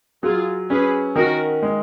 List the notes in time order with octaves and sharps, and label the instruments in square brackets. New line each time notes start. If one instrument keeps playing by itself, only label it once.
[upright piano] F#3 [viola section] F4 G#4
[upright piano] C#4 [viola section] G#4 B4
[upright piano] D#3 [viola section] F#4 A#4
[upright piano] G#3